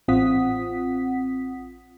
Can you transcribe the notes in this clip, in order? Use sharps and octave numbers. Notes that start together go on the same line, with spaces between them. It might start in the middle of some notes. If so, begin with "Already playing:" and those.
A1 C4 F4 F#5 D#6 B6